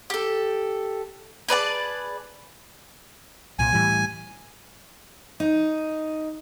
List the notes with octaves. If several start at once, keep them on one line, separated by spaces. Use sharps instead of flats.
G4 A4
G#4 B4 D5 A5
C2 A#2 G#5
A2 E3 G3
D#4